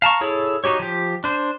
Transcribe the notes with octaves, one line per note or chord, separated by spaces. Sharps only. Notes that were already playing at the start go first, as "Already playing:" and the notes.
F5 A5 A#5 C#6
E4 G#4 A4 C#5
D#4 F#4 G4 C#5
F3 G4
D4 C5